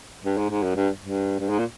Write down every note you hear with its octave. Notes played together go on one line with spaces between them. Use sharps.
G2
G#2
G#2
F#2
G2
G2
G2
G#2
A#2